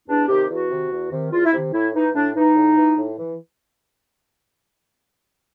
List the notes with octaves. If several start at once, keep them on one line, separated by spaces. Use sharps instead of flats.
E2 D4
C3 D#3 G4
E2 F#4
C3 D#3
E2
C3 D#3
E2 F4
E4
C3 D#3
A2 E4
E3 D#4
A2 D4
E3 D#4
A2
E3
A2
E3